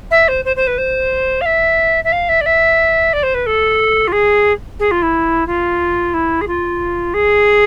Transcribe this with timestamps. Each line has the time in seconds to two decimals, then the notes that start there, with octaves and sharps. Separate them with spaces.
0.11 E5
0.28 C5
0.45 C5
0.56 C5
0.67 B4
0.78 C5
1.41 F5
1.45 E5
2.04 E5
2.12 F5
2.29 E5
2.41 D5
2.46 E5
3.13 D5
3.23 C5
3.34 B4
3.46 A4
4.07 F4
4.12 G#4
4.79 G#4
4.91 F4
5.02 E4
5.47 F4
6.14 E4
6.41 G#4
6.47 F4
7.14 G#4